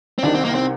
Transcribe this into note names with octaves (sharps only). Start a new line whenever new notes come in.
C4
C2 C3 D#3 D4
C4
A#3
C4